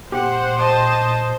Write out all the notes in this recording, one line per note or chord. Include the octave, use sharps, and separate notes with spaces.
A#2 G4 C5 F#5
D#5 A5